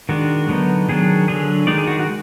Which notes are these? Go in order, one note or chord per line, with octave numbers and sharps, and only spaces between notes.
D#3 G#3 D4 F#4
D3 F#3 B3 D#4
D#3 F#3 D4 G#4
D3 F#3 D4 G#4
D#3 G#3 D#4 D5
G#4
F#4
F#4